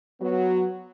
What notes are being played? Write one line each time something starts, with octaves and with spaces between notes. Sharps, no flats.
F#3 B3 F#4